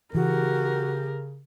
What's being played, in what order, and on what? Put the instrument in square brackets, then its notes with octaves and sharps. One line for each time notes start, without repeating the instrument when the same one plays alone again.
[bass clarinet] C#3 [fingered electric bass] E3 [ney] F#4 [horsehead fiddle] G4 A#4